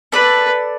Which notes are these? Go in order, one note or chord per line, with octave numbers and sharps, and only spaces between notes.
A4 B4 D5